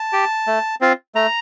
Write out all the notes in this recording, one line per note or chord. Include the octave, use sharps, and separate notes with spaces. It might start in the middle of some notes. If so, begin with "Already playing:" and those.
Already playing: A5
G4
A3
C4 F4
A3 A#5